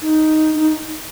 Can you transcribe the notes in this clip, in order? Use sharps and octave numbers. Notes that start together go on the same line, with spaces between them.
D#4
D#4